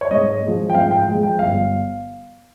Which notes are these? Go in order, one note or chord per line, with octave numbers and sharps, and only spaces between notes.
C#5
G#2 D#5
G#3
F3
G5
G#2 F5
G5
F3 G#3
G5
G1 F5